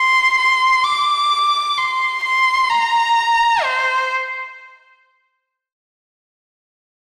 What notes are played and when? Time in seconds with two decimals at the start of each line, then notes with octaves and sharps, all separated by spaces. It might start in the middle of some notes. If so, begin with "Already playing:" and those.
Already playing: C6
0.38 C6
0.84 D6
1.78 C6
2.24 C6
2.70 A#5
3.63 C5